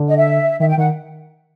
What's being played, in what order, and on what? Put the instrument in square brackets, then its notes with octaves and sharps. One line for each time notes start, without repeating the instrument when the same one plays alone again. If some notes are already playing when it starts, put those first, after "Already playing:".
Already playing: [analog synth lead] D3
[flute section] D#5
E5
[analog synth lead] D#3 [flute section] E5
[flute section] G5
[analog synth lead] D#3 [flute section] F#5